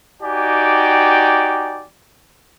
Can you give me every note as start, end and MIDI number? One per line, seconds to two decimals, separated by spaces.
0.23 1.85 63
0.23 1.85 66
0.23 1.85 67
0.23 1.85 74
0.23 1.85 79
0.23 1.85 80